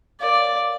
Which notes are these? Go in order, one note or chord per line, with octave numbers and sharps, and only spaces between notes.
A#4 C#5 D5 F5